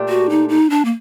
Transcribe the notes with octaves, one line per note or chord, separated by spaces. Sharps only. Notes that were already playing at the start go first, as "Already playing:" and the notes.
Already playing: A#2 A3 D4 G4
F#4
D#4
D#4
D4
A#3